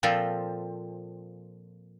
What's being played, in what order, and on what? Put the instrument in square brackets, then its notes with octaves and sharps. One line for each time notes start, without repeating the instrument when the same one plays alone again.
[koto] A#2 F3 C4 F4 A4